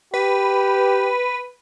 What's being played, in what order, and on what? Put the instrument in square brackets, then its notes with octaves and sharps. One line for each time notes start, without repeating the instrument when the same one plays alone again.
[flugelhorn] G4 [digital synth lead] B4